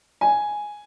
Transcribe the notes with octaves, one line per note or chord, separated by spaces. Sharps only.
G#5